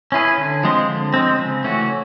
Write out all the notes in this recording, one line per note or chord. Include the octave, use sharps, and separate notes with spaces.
C#4 E4 G#4 B4
D3
F3 G#3 C4
D3
F3 G#3 C4
C#3
E3 A3 C#4 F#4